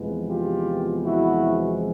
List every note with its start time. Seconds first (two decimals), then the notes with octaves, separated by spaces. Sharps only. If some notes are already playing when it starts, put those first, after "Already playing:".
Already playing: E2 C3 F3 G#3 B3
0.28 F4 G4
1.03 E4 F#4